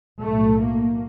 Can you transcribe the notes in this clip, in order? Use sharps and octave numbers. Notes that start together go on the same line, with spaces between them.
B1 A2 A3
A#3